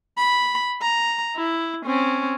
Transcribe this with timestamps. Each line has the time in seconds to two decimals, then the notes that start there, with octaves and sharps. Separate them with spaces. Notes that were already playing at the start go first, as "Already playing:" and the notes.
0.18 B5
0.82 A#5
1.37 E4
1.86 C4 C#4